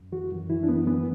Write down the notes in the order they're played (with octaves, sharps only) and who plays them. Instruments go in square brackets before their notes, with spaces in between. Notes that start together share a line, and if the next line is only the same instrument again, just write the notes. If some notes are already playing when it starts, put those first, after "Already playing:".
Already playing: [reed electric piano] F#2
E3 F#4
F#2
E3 E4
D4
F#2 B3
E3 B3